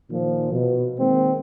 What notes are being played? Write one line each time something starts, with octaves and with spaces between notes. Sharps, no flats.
A#2 D#3 F3
B2
D#3 G#3 A#3 C4